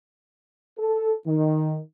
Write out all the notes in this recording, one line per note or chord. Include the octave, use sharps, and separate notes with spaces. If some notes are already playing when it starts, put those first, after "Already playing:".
A4
D#3